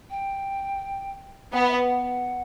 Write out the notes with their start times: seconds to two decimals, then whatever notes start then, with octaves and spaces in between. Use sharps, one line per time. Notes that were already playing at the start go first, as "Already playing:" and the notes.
0.10 G5
1.53 B3 G5
1.60 F#5
1.67 E5
1.74 F#5